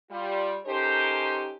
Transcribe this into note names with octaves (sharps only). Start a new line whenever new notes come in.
G3 F4
C#4 D#4 G4 A4 A#4 C5